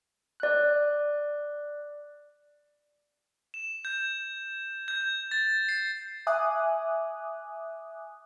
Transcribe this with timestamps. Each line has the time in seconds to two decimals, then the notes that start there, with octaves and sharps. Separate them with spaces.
0.40 D5 F#6
3.54 E7
3.85 G6
4.88 G6
5.31 A6
5.69 C7
6.27 E5 G#5 D6 D#6 F#6